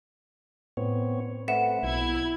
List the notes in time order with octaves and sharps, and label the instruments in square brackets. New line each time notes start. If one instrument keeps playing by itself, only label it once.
[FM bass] A2 [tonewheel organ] B3 C4 C#5
[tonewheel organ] A3 C4 B4 [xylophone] E5 F#5 E7
[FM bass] B1 [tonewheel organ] B2 [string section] E4 G#6